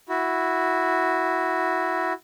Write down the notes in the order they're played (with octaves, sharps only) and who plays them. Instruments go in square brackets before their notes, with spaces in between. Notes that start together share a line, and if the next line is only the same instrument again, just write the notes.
[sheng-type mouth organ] E4 F#4